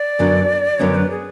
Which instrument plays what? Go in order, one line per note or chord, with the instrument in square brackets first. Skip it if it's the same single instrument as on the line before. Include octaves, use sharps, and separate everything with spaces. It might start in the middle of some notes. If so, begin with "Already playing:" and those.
Already playing: [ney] D5
[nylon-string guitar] F#2 D3 F#3 B3 D4
[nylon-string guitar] F#2 D3 F#3 B3 D4 [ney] C#5
[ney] B4
G#4